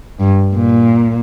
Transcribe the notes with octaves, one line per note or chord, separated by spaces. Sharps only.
G2
A#2